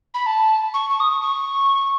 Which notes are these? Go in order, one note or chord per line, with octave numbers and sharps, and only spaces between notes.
B5
A5
C#6
C#6
D#6
C#6
C#6